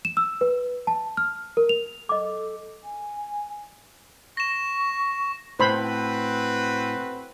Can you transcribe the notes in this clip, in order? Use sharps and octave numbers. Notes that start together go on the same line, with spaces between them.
E7
E6
B4
A5
F6
A#4
F7
A4 D#5 D6
G#5
C#6 A#6 E7
A2 C4 F#4 B4 C5 B5